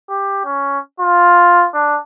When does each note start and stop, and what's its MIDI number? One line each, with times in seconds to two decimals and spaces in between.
0.10 0.44 67
0.45 0.79 61
1.00 1.66 65
1.74 1.98 62